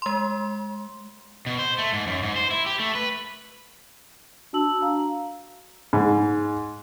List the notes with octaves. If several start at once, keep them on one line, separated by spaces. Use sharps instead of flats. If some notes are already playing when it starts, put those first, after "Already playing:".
G#3 C6
B2
C5
A3
G#2
F#2
G#2
C5
E4
G4
A3
B4
D4 F#4 A5 E6 F#7
F5 A#5
G#2